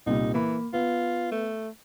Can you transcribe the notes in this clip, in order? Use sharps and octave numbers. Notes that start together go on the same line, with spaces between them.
C2 A#2 G3 D#4
E3 A#3 B5
B3 F4
A3